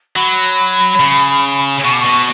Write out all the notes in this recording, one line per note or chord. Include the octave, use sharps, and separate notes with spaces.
F#3 B5
C#3
B2 C#6
D6
B2 C#6